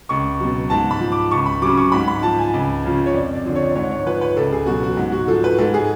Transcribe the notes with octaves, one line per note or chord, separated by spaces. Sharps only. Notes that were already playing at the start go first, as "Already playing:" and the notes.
C#2 C#6
B2 F#3
G#2 A5
B5
F3
D6
C#2 C#6
B5
C#3 F#3 D6
C#6
G#2 B5
B5
F3 A5
G#5
C#2
C#3 F3
C#5
F2 D5
D5
D3 F3
C#5
G#2 C#5
C#5
F3 B4
B4
C#2 A4
G#4
B2 F#3 F#4
F#4
G#2
F#4
F3 A4
B4
G#2 A4
G#4